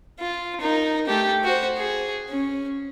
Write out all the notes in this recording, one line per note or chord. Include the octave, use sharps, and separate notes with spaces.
F4
D#4 A#4
A3 G4
F#4 C5
G#4
C#4